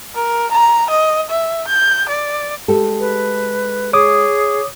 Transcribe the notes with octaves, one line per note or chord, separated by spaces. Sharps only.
A#4
A#5
D#5
E5
G6
D5
G#3 G4 A4
B4
G#4 C#5 D6 D#6